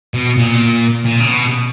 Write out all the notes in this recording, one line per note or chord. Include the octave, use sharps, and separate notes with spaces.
B2
A#2
A#2
C#3
B2